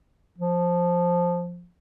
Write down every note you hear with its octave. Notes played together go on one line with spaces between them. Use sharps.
F3